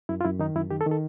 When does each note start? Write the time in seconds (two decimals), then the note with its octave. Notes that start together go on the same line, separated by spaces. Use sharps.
0.09 F#2 E4
0.21 F4
0.24 F#2 E4
0.39 D#3 D#4
0.56 F#2 E4
0.71 D#3 G4
0.81 A4
0.86 D#3
0.91 A4